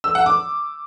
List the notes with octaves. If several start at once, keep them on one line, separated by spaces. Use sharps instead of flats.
E6
F#5
D6